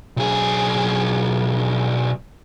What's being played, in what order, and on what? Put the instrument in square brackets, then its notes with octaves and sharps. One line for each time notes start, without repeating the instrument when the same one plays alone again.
[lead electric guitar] B1 G#4